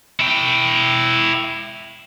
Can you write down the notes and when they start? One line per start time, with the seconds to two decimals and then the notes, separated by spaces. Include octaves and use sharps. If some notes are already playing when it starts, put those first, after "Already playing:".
0.20 E4 G5